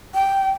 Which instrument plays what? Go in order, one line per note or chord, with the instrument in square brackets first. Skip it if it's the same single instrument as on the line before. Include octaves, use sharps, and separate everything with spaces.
[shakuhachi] G5